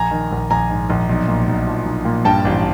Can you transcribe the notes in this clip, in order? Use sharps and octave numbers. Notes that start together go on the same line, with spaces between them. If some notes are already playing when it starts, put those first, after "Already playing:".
Already playing: A#1 G#5 A#5
D#3
A#1
A#1 G#5 A#5
G#2
A#1
B1
A#2
B1
F3
B1
A#2
G2 G5 A5
A1